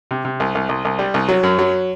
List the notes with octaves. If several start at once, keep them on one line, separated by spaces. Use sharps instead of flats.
C3
C3
C2
C2
C2
C2
G3
C2
F#3
F#2
F#3